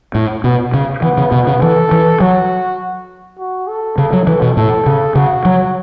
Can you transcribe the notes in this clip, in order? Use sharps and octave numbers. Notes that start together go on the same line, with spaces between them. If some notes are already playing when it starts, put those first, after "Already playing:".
A2
B2
C#3
E3 B3
C#3
B2
C#3
E3 A4
E3
F#3 F#4
F#4
A4
C#3 A4
F#3
E3 A4
B2
A2 A4
C#3
C#3 F#4
F#3